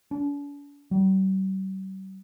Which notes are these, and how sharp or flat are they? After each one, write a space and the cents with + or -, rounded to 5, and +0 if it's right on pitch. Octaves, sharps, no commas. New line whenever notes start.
D4 -45
G3 -45